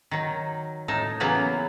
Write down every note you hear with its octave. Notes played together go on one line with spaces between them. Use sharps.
D#3 F#3
A2 D#4 A5
C#3 E3 F#3 A#3 B3